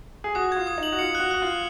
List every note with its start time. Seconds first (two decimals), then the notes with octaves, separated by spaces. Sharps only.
0.24 G#4
0.35 F#4 D#6
0.52 F4 G#6
0.67 D#6
0.78 D#4 F#7
0.92 F#4
0.99 F4 C#7
1.15 F#6
1.20 F#4
1.31 F#4 F#6
1.42 F4 F#6